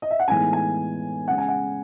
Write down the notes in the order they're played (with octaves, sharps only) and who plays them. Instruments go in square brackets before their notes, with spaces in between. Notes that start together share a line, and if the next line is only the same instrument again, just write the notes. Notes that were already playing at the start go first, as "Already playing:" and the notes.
[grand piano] D#5
E5
F#5
A2 E3 G#3 B3 D#4 G#5
G#5
C#3 G#3 C#4 F#5
G#5
F#5